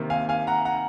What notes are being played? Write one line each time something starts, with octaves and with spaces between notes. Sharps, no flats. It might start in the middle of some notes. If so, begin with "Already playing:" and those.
Already playing: C3 D#3 A#3
F5 G#5
F5 G#5
F#5 A#5
F#5 A#5